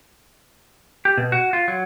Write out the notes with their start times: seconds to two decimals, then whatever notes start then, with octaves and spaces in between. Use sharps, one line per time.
1.05 G4
1.18 B2
1.32 F#4
1.53 F4
1.68 F#3